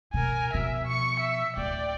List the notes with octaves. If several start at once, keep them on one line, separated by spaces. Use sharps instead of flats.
B2 A#4 G#5
B2 F3 E5
C#6 C#7
E5
D1 D5 G5